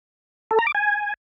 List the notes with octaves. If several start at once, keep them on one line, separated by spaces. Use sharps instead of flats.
A4
A#5
D6
G#5